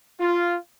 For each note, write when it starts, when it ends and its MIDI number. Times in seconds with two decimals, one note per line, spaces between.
0.20 0.56 65